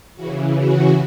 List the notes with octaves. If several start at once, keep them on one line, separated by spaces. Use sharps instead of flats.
C#3 E3 F#4
F#4